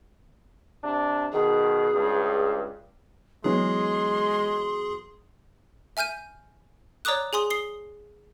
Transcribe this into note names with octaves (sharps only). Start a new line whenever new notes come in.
C3 D4
B2 D#3 G#4
C#2 G2
E3 F#3 G#3 B3 G#4 C6
E5 G#5 F6 G6 D#7
C#5 D5 A#5 D6 D#6 F#6
G#4 G#5 C6 D#6
D#6 C7 G7